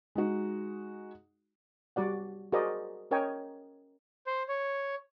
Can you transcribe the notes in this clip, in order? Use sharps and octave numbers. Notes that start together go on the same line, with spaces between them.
G#3 D#4 F#4
G3 F#4 D5 F#5
F#4 G#4 A#4 C5 D5 D#5
C#4 A#4 C#5 D#5 G5 G#5
C5
C#5